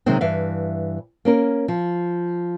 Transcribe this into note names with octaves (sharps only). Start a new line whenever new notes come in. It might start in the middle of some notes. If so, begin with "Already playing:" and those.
C3 D#3 F#3 G#3 C4
G2 E3 E5 F5
A#3 C#4 A#4
F3